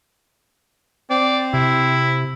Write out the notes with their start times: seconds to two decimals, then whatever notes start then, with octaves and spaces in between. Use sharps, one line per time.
1.10 C4 D5
1.54 C3 E4